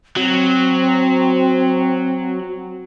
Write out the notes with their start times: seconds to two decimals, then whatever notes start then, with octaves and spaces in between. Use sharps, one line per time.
0.17 F#3 C4